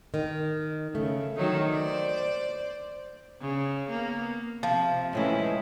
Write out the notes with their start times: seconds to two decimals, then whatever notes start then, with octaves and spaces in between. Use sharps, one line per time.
0.14 D#3
0.95 C#3 A3
1.37 D#3 F#3 D#4
1.69 C5 D5
3.41 C#3
3.90 A#3 B3
4.63 C3 F3
5.13 A2 D#3 E3 G#3 C#4 E4